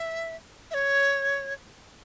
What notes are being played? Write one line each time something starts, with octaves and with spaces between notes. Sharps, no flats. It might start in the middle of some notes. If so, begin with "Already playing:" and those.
Already playing: E5
E5
C#5